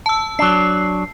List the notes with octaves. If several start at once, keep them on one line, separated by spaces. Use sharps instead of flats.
A5 E6
F#3 D4 C7